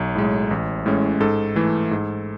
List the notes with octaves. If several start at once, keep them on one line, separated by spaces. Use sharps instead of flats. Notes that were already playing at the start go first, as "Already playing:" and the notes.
Already playing: B1 C#5
A2 G#3
A1
A2 G#3 C#4
G#2 A4
E3 A3
G#2